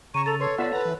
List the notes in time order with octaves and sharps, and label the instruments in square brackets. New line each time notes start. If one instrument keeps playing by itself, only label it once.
[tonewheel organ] C#3 [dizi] A#5 [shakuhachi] C#6 [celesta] D#7 E7
[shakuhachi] A4 [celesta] A6 F7
[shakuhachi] A4 [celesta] B4 C6 C7 [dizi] C#5
[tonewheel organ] B3 F4 E5 [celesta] C#5 F#5 [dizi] D5
[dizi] B4 [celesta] F#5 [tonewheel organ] A#5
[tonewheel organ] E3